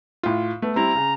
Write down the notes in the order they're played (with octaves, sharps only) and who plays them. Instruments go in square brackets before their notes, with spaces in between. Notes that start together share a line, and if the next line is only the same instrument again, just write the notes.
[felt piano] A2 F4
A3 B3
[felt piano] G3 C4 E4 [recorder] A#5
[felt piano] C#3